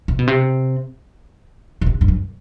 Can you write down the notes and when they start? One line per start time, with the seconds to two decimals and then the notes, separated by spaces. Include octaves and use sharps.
0.08 C3
0.19 B2
0.27 C3
1.81 C#3
1.86 C3
2.01 G2
2.08 F#2